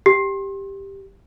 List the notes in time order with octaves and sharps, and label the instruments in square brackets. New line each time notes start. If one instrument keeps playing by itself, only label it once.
[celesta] G4